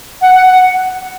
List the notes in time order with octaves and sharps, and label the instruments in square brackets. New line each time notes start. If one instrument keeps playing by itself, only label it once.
[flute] F#5
F#5
F#5